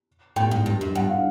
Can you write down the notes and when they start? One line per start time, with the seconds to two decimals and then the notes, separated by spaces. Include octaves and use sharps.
0.36 A2 G5
0.51 G#2
0.66 G2
0.81 F#2
0.95 G2 F#5
1.10 F5